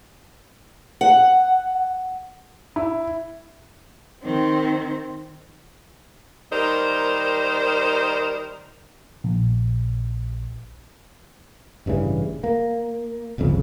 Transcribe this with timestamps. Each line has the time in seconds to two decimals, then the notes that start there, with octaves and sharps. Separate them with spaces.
1.01 F#5
2.76 E4
4.24 D#3 C4
6.52 D#3 G3 D#4 A#4 C5
9.24 A#1
11.86 A1 G2 C#3 E3
12.44 A#3
13.38 D1 G1 F2 C#3